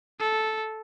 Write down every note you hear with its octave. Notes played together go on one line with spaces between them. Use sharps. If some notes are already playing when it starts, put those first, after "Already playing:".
A4